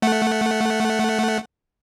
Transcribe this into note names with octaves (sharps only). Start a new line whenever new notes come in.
A3 F#5